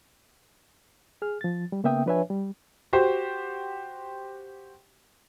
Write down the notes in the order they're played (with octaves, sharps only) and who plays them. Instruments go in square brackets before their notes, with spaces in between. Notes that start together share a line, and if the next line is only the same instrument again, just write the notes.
[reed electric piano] G#4 F6
F3 A6
G3
C#3 A#3 B3 E5 G5 D#6
F3 D4 B4 C#5 E5 G#5
G3
[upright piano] F#4 G4 C5